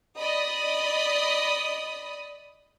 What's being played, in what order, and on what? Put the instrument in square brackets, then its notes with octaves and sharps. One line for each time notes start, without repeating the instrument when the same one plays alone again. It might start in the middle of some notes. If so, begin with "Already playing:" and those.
[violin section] D5 D#5 B5 D#6